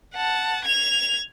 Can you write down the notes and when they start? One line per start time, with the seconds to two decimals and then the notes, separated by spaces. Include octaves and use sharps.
0.15 F#5 A5
0.65 G#6 F7